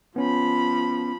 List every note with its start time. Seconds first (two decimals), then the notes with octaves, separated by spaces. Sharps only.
0.16 F3 B3 C#4 B5